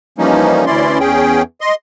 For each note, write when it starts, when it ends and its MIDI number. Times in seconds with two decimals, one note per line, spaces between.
0.18 0.65 52
0.18 0.65 53
0.18 0.65 55
0.18 0.65 58
0.18 0.65 61
0.18 0.65 63
0.66 0.99 38
0.66 0.99 52
0.66 0.99 61
0.66 0.99 64
0.66 0.99 74
0.66 0.99 84
1.00 1.42 40
1.00 1.42 61
1.00 1.42 68
1.00 1.42 79
1.61 1.75 75
1.61 1.75 84